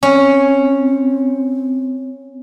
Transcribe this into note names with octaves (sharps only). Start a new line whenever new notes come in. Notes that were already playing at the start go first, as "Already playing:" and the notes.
C4 C#4